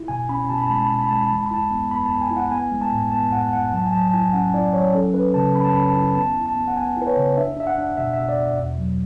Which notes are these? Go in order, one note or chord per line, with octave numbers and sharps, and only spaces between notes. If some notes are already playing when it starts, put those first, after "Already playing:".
Already playing: E4
B2 G#5
C#4 B5
B2 A5
B5
A5
G#3 B5
A5
B5
B2 A5
B5
G#3 A5
B5
A5
E3 B5
A5
B5
E4 A5
B3
B3 B5
A5
B3
G#5
E4
F#5
B3 G#5
G#3
A5
A2
B3 A5
A2 F#5
A2 F#5
F#3 A5
G#5
F#3 A5
A5
E4 G#5
C#4 F#5
E4 D5
F#3 C#5
C#4 A4
C#4 B4
C#3 A5
C#4 B5
A5
C#4 B5
A5
E4
B3 A5
E4
A5
B3
F#5
B3 G#5
E4 B4
C#5
C#3
D4 E5
D4 E5
F#5
D4
B2 E5
E5
B2
D5
B2
E2
F#3